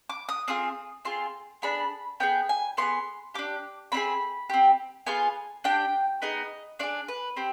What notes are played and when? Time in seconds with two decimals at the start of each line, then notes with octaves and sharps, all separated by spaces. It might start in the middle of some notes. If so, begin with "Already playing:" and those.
0.09 D6
0.29 D#6
0.48 C4 F4 G#4 D#6
1.05 C4 F4 G#4 C6
1.62 B3 D4 G#4 B5
2.20 B3 D4 G#4 G5
2.49 G#5
2.77 B3 F4 C6
2.82 G#4
3.34 D4 G4 D6
3.92 C4 D#4 G#4 B5
4.49 C4 G4
5.06 B3 F4 G#4 G#5
5.64 D4 G4 G5
6.22 B3 D#4 G#4 D#5
6.79 D4 F4 G#4 D5
7.08 B4
7.36 C4 G4